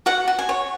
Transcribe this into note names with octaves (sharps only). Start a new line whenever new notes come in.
F#4 F#5
F#4
G#5
C#5